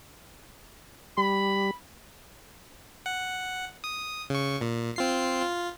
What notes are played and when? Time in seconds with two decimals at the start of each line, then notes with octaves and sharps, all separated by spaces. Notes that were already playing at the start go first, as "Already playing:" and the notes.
1.18 G3 B5
3.06 F#5
3.84 D#6
4.30 C#3 C#6
4.61 A#2
4.96 C4 F4 C7
5.42 F4